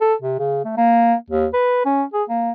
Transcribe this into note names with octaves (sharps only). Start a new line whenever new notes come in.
A4
C3
C#3
A3
A#3
D#2
B4
C#4
G#4
A#3